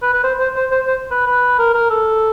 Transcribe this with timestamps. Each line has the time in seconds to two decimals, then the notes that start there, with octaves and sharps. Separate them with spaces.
0.02 B4
0.13 B4
0.24 C5
0.39 C5
0.56 C5
0.71 C5
0.87 C5
1.11 B4
1.27 B4
1.59 A#4
1.74 A#4
1.90 A4